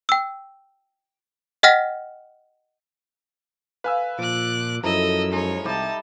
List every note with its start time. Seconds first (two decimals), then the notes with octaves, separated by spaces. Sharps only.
0.09 G5 E6
1.63 D#5 F#5 G5 F6 A#6 B6
3.84 B4 F5 G#5 E6
4.19 A#2 F3 D6 F#6
4.84 F#2 F3 E4 A4 D#5 A#5 E6
5.32 G#3 D#4 C#5
5.65 C2 G3 D#4 G4 E5 A5